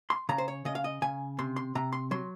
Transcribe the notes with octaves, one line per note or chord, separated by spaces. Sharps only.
C6
C#3 A#5
C5
C#5
C#3 D#5
F5
D#5
C#3 G#5
C3 C6
C6
C3 A#5
C6
F#3 C6